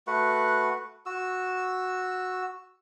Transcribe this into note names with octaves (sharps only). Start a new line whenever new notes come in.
A3 F#4 B4 F#5
F#4 E6